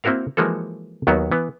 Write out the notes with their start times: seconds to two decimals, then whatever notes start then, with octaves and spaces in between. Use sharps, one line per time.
0.04 A#3 C4 E4 F#4 A#4 F5
0.37 E3 F3 G#3 A#3 F#4 A4
1.07 D#2 D#3 F#3 B3 F#4 C#5
1.32 E3 B3